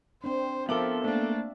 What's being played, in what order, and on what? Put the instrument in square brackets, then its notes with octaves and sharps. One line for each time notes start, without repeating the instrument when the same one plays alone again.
[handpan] C4 D4 [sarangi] C5
[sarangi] F3 [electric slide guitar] B3 A4 [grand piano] A#4 D6 F#7 [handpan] E5
[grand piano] A3 A#3 [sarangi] D4